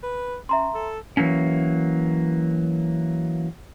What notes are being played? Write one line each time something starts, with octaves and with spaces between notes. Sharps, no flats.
B4
C#4 E5 A#5 C6
A4
E3 F#3 A#3 C#4